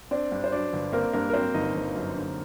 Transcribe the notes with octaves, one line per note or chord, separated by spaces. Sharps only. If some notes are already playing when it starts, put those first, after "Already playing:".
C4 D4 D5
G2
C5
F#3 D4 D5
G1
A#3 C4 A#4
G2 A#3 A#4
A#4
F#3 C4 C5
G1 D#4 D#5
G1
F#2
D3